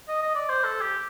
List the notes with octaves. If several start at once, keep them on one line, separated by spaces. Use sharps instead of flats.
D#5
D#5
D5
C5
A4
G4